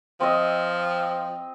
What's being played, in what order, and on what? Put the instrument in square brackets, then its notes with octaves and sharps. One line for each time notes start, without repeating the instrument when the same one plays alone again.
[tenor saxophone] F3 [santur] C4 D#5